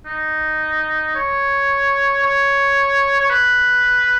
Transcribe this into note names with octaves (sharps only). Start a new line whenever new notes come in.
D#4
C#5
C#5
C#5
B4